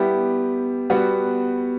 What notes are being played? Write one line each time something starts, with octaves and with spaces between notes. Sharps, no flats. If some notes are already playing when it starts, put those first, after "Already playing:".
Already playing: G3 B3 E4 G4
G3 B3 F#4